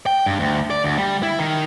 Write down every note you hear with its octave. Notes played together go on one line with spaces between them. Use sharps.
G5
G2
D2
D5
D2
G3
E4
D#3